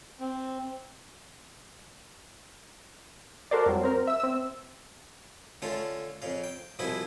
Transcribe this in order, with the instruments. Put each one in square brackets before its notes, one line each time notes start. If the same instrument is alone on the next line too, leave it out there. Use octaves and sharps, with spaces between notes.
[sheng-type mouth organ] C4
[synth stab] F#4 A4 A#4 C5 D5
F2 F#3 G3
C4 A#4
E5 E6
C4 E6
[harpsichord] D3 A3 C#4 F4 A4 F5
F2 C#3 F5
G5
C2 B2 F3 E4 G#4 B5